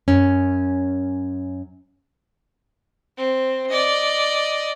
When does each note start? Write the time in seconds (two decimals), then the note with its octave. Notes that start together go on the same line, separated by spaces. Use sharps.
0.08 F#2 C#4
3.18 C4
3.69 D5 D#5